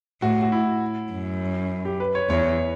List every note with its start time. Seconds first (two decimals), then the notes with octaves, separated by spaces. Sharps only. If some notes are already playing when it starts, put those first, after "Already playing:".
0.22 A2 F#4
0.42 F#4
0.52 E4
1.12 F#2
1.85 G4
2.00 B4
2.15 C#5
2.29 E2 C#5